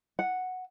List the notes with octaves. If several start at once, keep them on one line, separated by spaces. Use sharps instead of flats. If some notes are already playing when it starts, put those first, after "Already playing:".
F#5